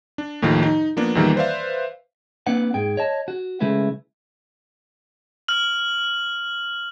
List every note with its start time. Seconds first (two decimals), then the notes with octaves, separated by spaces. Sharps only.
0.18 D4
0.42 D#2 A2 D#3 F3
0.63 D#4
0.97 F3 A#3 B3 D4
1.15 E2 A#2 D#3 E3 G3 A#3
1.36 B4 C5 D5 E5 F5
2.47 A#3 C4 D4 B4 F#5
2.74 G#2 G#4 G5
2.97 C#5 D#5 A5
3.28 F#4
3.60 C#3 G#3 A3 E4 B4
5.48 F6 F#7